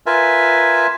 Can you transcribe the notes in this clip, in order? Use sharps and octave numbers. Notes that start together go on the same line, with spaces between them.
F4 A#4 B4 E5 G#5